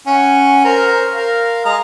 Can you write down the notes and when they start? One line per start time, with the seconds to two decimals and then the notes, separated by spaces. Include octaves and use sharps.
0.07 C#4 F#5
0.65 A#4 C5 F6
1.14 A#4 F5
1.65 G#3 A#5 D#6